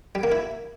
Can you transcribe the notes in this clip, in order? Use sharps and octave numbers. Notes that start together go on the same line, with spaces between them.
G3
A#3
E4